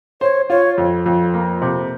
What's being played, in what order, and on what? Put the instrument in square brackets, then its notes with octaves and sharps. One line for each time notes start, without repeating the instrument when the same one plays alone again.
[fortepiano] C5 [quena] C#5
[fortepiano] F4 [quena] C#5
[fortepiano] F2
F2
A#3
C3